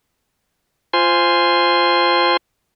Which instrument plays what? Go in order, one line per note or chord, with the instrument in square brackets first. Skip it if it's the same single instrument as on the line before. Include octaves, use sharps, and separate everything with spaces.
[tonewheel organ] F4 C5 G#5 C6